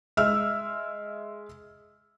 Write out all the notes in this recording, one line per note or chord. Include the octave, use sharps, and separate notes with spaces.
G#3 E5 E6 F6